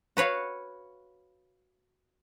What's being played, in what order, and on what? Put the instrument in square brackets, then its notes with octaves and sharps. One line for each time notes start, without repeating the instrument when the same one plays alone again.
[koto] F#4 B4 C#5 F5